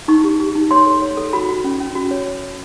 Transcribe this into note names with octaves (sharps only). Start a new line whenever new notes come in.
D#4 C#6
G4
G4
D#4
C#5 C6
A4
C#5
A4
F#4 B5
F#4
C#4
C#4
F#4
C#5